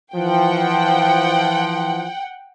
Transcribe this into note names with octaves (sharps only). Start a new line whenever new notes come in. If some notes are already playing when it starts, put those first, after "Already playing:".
E3 F3 F#5 G5